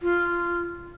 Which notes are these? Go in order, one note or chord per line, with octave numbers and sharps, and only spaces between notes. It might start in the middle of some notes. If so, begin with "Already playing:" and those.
F4